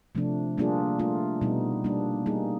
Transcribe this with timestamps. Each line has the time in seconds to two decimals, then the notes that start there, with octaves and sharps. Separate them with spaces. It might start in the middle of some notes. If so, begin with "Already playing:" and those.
0.15 C3 F3 A3 D4
0.57 G3 A#3 D4 F4 G#4
0.99 A3 D4 F4
1.41 B2 G3 B3 D#4
1.84 G3 A#3 D4
2.26 G3 A#3 D#4 G#4